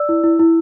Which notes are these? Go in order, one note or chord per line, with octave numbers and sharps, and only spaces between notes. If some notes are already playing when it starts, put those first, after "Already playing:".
Already playing: D5 E6
E4
E4
E4